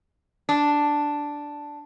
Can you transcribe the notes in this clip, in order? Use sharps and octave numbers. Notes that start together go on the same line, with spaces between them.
D4